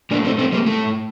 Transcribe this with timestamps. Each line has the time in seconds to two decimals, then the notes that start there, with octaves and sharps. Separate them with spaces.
0.11 A2 A#3 D4
0.25 A3 C4
0.39 A3 C4
0.52 G3 A#3
0.66 A2 A3